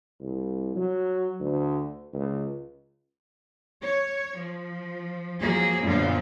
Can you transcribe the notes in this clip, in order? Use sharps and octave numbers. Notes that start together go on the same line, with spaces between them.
C2
F#3
D2
C#2
C#5
F3
F3 F#3 A#3 G#4
F#2 A#2 D3 F3 B3 F4